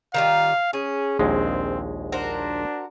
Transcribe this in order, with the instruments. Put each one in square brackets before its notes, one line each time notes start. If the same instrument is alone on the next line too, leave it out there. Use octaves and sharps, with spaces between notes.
[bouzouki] D#3 G3 F4 [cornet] F5
[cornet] C#4 [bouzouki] G#4
[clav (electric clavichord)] A#1 D#2 G#3 [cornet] C4
[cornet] D4 [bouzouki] F#4 A#4 C5